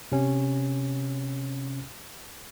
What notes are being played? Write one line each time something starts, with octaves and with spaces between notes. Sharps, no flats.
C3 C#4